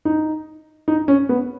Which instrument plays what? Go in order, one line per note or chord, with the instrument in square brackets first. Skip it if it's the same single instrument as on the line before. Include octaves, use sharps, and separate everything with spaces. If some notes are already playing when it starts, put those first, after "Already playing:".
[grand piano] D#4
D#4
C#4
B3